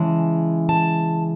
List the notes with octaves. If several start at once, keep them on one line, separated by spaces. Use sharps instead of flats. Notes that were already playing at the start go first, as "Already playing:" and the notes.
Already playing: C#3 E3 G#3 A5
A5